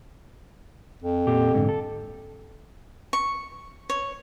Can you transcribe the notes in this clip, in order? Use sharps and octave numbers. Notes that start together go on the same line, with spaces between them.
F2
A#2 G4
G#2 D3
A4
C#6
C#5